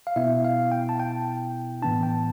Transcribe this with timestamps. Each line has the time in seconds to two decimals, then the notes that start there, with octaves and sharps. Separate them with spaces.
0.07 F5
0.16 B2 B3 E4 E5
0.44 F5
0.71 G5
0.89 A5
1.00 G5
1.82 A2 E3 B3 D4 A5
2.03 G5